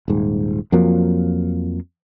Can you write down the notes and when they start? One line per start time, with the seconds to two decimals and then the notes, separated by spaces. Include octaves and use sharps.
0.08 D#1 G#2
0.72 F2 F3 F#3 A#3